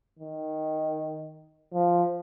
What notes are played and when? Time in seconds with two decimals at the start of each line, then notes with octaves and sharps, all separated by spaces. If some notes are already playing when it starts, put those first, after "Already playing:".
0.19 D#3
1.73 F3